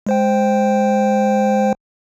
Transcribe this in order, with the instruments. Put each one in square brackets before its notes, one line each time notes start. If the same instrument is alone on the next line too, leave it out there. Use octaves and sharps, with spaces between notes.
[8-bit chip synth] G#3 C5 G5